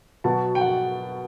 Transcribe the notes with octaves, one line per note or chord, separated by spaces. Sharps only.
B2 F#3 B3 A5
G5
F#5